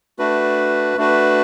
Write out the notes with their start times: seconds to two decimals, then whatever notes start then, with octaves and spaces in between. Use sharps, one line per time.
0.19 A3 D4 F#4 B4
0.97 A3 D4 F#4 B4